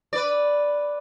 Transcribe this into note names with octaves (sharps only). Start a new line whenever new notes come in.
B4 D5